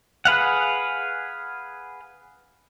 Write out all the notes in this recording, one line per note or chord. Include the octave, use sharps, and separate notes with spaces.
G#4 B4 F5 F#5